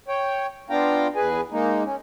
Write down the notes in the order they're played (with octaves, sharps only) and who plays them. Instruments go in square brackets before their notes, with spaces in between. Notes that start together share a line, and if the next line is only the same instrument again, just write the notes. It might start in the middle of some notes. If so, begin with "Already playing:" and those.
[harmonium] C#5 G5
B3 D4 F4 F5 G5 A#5
E2 G#4 B4 G#5
G#3 A#3 D#4
C#4